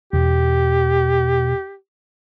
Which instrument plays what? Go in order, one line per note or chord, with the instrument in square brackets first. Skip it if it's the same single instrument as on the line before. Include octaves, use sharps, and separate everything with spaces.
[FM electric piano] E2 [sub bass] B2 [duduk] G4